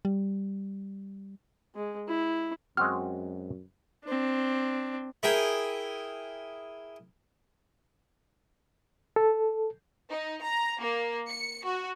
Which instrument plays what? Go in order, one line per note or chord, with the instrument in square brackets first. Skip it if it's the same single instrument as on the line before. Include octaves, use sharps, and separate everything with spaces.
[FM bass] G3
[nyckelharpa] G#3
E4
[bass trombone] F#2 [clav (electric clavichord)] G#3 C4 F#4 [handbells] F6
[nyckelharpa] C4 D4
[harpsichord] E4 G#4 A#4 G5
[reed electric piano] A4
[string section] D#4
A#5
A#3
C#7
F#4